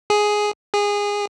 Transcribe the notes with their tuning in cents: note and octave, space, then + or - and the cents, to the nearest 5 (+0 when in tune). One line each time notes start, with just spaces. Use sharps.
G#4 +5
G#4 -20